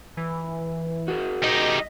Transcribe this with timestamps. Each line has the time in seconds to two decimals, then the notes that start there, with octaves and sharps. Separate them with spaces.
0.17 E3
1.08 F#4 G#4 A#4
1.43 G3 D#4 D#5